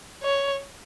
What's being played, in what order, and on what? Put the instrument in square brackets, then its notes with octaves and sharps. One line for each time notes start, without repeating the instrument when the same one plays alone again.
[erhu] C#5